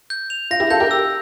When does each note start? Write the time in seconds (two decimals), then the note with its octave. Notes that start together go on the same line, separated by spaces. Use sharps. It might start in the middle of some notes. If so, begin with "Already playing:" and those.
0.10 G6
0.30 F7
0.51 F4 A#6
0.60 E4 G4
0.70 F4 A4 G6
0.80 G4 A#4
0.91 E6